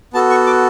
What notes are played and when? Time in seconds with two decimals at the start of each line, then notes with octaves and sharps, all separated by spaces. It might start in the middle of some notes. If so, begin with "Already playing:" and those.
0.13 B3 F#4 A4 A5
0.30 C#6
0.46 D6